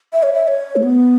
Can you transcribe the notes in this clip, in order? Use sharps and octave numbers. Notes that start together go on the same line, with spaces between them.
E5
C#5
E5
C#5
A3
B3